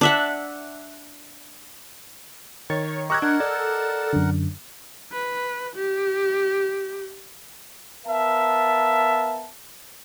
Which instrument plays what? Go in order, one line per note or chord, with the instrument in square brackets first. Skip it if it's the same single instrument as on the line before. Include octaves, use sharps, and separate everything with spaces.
[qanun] D4 E5 F#5
[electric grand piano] D#3 [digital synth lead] C#5 [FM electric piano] A6
[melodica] G4 A#4 A#5 [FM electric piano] D#5 E6 [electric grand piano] C#6 F#6 G#6
[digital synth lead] D4 [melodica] A#4 F#5
[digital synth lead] A4 [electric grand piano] D5
[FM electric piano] F#2 D3
[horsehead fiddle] B4
G4
[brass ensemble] B3 A#4 E5 F5 A5